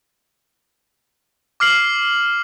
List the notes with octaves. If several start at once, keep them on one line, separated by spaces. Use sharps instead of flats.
D6 F6 C7 F#7